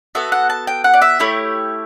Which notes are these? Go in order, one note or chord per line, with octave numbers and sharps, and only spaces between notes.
B3 F#4 A4 E5
F#5
A5
G5
F#5
D5
E5
A3 E4 G4 C#5